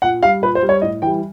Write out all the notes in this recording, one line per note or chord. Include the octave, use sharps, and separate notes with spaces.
A#2 F#5
G3 F5
A#2 B4
C5
G3
C#5
A2 D#5
E3 G3 G5